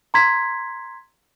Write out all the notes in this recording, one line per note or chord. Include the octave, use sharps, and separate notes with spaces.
A#5 C6 G#6 B6